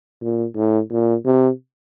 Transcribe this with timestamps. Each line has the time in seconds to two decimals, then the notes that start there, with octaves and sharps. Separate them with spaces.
0.21 A#2
0.56 A2
0.91 A#2
1.25 C3